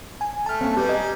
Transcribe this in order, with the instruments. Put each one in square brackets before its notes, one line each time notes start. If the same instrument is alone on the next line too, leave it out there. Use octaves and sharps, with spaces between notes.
[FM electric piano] G#5
[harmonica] A3 [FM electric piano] A5 F6
[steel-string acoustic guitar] A#3 C#4 [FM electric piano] C4 A5
[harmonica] G3 [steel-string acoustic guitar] G4 B4
[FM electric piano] D#5 G#6 [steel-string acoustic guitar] G#5 A#5